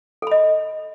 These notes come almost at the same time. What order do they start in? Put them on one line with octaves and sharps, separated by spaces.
A4 B5 D#5